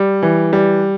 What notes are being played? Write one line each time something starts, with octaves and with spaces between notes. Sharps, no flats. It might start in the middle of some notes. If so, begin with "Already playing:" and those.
Already playing: G3
E3
G3